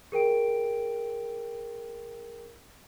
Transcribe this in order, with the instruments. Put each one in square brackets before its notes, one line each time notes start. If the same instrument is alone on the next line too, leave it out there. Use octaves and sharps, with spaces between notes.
[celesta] G#4 A#4 G5 D7